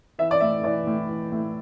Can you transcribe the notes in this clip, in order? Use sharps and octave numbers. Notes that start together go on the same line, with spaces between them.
E3 E5
D5
A2 E5
E3 D5
A2
E3
A2